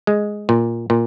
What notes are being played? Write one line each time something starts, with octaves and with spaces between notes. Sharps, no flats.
G#3
A#2
A#2